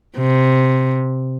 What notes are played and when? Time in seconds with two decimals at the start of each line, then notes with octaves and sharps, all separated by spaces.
0.17 C3